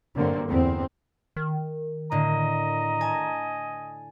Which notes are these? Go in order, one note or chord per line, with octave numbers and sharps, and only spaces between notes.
G2 D3 F#3 A#3 C4
E2 C4
D#3
A2 D3 D#5 A#5
G#5 A5